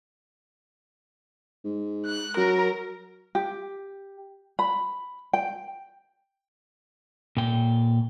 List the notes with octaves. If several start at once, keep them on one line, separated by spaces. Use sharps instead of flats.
G#2
F#6
F#3 A#4
G4
B5
G5
A#2 G5